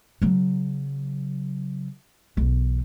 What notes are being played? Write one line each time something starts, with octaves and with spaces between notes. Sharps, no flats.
C#3 F#3
B1 E2